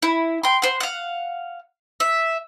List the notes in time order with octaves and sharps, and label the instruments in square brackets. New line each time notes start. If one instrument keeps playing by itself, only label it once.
[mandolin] E4
G5 C6
C5 F#5
F5 F#5
E5